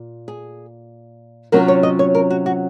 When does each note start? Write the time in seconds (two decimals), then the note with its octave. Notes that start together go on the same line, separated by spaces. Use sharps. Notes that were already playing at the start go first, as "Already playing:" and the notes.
Already playing: A#2
0.28 G#4
1.52 C3 F#3 C#4 F4 A#4
1.68 C#5
1.83 D#5
1.99 C#5
2.15 A#4
2.30 F#4
2.46 F#4